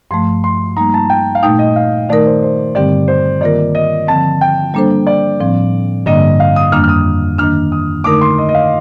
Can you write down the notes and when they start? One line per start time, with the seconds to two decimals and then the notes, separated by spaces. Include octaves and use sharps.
0.11 G2 F3 A3 C6
0.44 C6
0.77 G3 A#3 D#4 A#5
0.94 A5
1.10 G5
1.35 F5
1.43 A#2 A3 D#4 G5
1.59 D#5
1.76 F5
2.09 D#3 A3 D#4 A#4 D5
2.26 C5
2.43 C5
2.75 G2 D3 G3 C4 G4 D5
3.08 C5
3.41 D#3 A#3 F4 A#4 D5
3.75 D#5
4.08 D3 F3 C4 A5
4.41 G5
4.74 G3 A#3 D4 A4 C5
5.07 D5
5.40 A2 F3 C4
6.06 G2 D3 G3 A#3 D4 D#5
6.40 F5
6.56 D#6
6.72 F2 D#3 G3 A#3 D4 F6
6.84 F6
6.89 D#6
7.38 D#3 A#3 D4 F6
7.72 D#6
8.04 D3 A3 D#4 A#4 D6
8.21 C6
8.38 D#5
8.49 D#5
8.55 F5